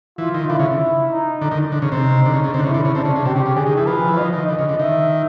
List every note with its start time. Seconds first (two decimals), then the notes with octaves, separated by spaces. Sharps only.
0.18 E3 F4
0.34 D#3
0.49 D3 E4
0.59 C#3
1.10 D#4
1.41 D3
1.51 D#3
1.72 D3 D#4
1.82 C#3
1.92 C3
2.26 D3
2.33 C#3
2.44 C#3
2.54 C3
2.59 D3
2.64 C#3 E4
2.74 D3
2.85 C#3
2.95 C3 D4
3.05 C#3
3.16 C#3
3.25 C3 G4
3.36 C#3
3.46 C#3
3.56 D3 G#4
3.66 D#3
3.77 E3
3.86 F3 B4
4.08 E3
4.17 F3 D#5
4.33 D#3
4.48 D3 D#5
4.59 C#3
4.69 D3
4.79 D#3 E5